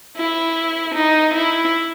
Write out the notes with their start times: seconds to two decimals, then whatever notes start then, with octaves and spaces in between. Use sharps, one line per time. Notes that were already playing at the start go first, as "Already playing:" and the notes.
0.16 E4
0.95 D#4
1.34 E4